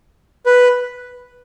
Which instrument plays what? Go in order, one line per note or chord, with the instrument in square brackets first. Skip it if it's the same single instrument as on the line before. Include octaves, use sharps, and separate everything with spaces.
[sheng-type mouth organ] B4